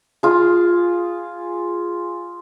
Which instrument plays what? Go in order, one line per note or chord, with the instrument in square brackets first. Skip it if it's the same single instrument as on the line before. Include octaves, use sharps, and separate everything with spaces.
[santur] F4 G#4